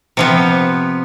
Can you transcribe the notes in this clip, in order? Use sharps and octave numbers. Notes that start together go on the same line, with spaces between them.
C3 F3 B3